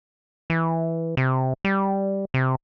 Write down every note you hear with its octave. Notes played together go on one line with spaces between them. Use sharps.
E3
C3
G3
C3